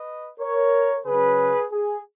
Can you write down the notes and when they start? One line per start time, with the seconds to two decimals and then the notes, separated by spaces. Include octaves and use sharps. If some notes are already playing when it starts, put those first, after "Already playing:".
Already playing: B4 D#5
0.39 A#4 C#5
1.05 C#3 F#3 C#4 G#4 B4
1.72 G#4